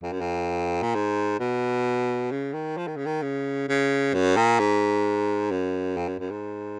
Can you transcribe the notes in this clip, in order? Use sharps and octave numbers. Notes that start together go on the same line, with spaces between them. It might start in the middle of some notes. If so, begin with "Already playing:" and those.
F2
F#2
F2
A#2
G#2
B2
C#3
D#3
F3
D#3
C#3
D#3
C#3
C#3
F#2
A#2
G#2
F#2
F2
F#2
F#2
G#2